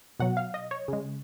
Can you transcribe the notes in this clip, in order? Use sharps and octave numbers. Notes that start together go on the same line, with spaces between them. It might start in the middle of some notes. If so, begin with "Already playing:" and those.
B2 F#3 F#5
F5
D#5
C#5
C#3 G#3